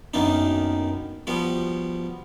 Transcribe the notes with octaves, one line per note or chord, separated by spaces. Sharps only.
F#2 D#3 A#3 B3 D4 D#4
F3 G3 B3 F#4